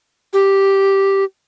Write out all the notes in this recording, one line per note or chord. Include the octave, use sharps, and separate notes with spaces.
G4